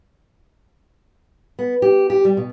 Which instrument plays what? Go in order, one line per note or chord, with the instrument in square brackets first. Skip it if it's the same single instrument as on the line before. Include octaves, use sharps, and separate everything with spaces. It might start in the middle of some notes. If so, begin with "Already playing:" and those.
[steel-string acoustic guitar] B3
G4
G4
G3
B2